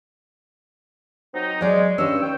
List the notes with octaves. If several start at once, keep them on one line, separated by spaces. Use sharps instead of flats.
F#3 C4 D#4
F#3 G#3 D5
G2 D#3 C#4 E6
C#5 G5